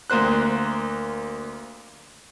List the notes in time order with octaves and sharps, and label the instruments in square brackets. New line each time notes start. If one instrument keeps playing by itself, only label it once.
[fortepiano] D2 A#3 C5 F#6